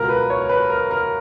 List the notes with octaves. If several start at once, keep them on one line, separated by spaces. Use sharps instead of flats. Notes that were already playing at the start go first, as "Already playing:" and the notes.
Already playing: C#2 B2 A#4
B4
C#5
B4
A#4
A#4